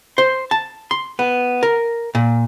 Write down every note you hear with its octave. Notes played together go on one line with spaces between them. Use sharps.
C5
A5
C6
B3
A#4
A#2